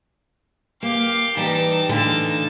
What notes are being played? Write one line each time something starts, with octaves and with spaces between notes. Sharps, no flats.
A#3 G4 F5
E3 G3 D#4 G4 A5
A2 D3 E3 F4